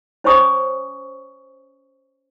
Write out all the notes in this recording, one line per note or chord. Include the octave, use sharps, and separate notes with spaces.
C#4 C5 C#5 G#5 C#6 D#6